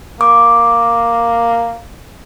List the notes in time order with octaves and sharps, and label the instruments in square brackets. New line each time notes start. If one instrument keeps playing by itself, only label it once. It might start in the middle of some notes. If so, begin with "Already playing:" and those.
[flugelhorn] A#3 [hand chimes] D6